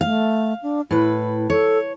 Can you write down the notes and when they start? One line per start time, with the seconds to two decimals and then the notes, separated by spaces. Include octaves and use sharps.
0.01 A3 F5
0.63 D4
0.91 A2 E4 B4
1.50 A4 C#5